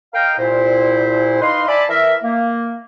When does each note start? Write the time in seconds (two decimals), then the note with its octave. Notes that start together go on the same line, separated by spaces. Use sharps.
0.14 A#4 D#5 F5 G5
0.38 C2 A#2 E4 C5
1.41 D#4 B4 D#5 F5 C6
1.68 D5 E5 G#5 A5 B5
1.89 E3 A#4 E5
2.23 A#3